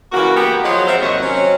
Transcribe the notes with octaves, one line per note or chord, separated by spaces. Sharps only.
C#3 E3 A#3 F#4
A#3 B3 G4
F3 F#3 G#3 F4 F#4
F3 C4 C5 E5
D#2 C3 F#3 C#5 D#5 F#5
F#3 C4 C#4